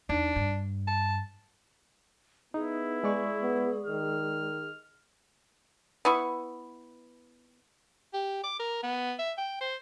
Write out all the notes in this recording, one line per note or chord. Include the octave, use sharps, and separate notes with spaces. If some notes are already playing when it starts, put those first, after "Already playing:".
E2 D4 D#4
G2
A5
B3 D#4 E4 G#4
G#3 D5 C#6
B3
D#3 F6
B3 E4 C#6
G4
D6
A#4
B3
E5
G5
C5